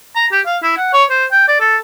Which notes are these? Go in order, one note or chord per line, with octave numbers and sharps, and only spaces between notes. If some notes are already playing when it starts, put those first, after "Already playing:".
A#5
G4
F5
E4
F#5
C#5
C5
G5
D5
A4